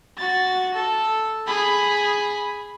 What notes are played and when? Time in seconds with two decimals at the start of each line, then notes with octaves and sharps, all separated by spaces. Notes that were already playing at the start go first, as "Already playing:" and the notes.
0.18 F#4 A6
0.75 A4
1.47 G#4 B5